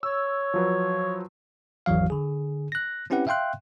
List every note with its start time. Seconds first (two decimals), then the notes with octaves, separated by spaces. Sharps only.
0.03 C#5 E6
0.54 F3 F#3 B4
1.86 G#1 E2 E3 F#3 F5
2.10 D3 G#4
2.72 F#6 A#6
3.10 C4 C#4 E4 G4 B4 F#5
3.27 E5 F5 G5 C6 F#6